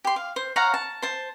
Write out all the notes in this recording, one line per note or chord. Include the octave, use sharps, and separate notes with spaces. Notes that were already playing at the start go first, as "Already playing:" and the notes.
G4 C6
F5
C5
C#5 F5 F#5 A#5
A5
C5 A5